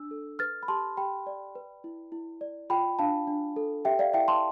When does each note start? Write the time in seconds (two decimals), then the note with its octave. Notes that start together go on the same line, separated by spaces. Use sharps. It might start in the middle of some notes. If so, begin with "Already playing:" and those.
Already playing: D4 E6
0.11 A4
0.39 B4 F6 A6
0.63 B5
0.68 G4 A5 C6
0.97 G4 G5 B5
1.27 D5
1.55 B4
1.84 E4
2.12 E4
2.41 D5
2.70 F4 G5 B5
2.99 D4 F5 A5
3.27 D4
3.56 A4
3.85 G4 E5 G5
3.99 D5 F5
4.13 E4 E5 G5
4.28 A5 C6